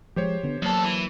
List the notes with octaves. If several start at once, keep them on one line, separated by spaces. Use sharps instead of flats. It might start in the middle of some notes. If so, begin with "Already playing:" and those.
F3 G#3 G4 C5 C#5
D3 B3
E2 F#3 A#3 A4
E3